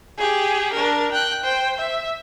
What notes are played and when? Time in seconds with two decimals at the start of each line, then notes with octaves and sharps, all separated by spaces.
0.18 G4 G#4
0.74 D4 A#4
1.12 G5 F#6
1.44 C5 G5
1.78 E5